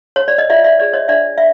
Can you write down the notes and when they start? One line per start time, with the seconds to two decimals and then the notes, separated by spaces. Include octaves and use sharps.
0.16 C#5
0.28 D5
0.38 D#5
0.50 F4 D5 E5
0.64 D5 E5
0.79 G#4 C#5 D5
0.93 C#5 D#5
1.08 D4 D5 E5
1.38 E5